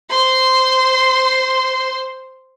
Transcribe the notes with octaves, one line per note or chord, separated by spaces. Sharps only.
C5 C6